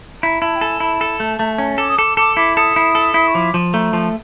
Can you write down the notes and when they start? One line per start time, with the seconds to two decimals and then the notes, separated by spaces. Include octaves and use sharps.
0.22 E4 A#5
0.41 E4 A5
0.56 G5
0.61 A4 G#5
0.80 E4 A5
1.01 A4
1.20 A3
1.39 A3
1.58 C#4
1.78 A4 D6
1.89 D#6
1.97 A4 D6
2.17 A4 D6
2.37 E4 D6
2.57 A4 D#6
2.76 E4
2.95 A4
3.14 E4
3.28 C#6
3.34 F3 D6
3.54 F3
3.73 A3 A#5
3.92 F3 A5